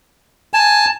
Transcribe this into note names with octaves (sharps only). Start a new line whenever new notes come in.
G#5 A5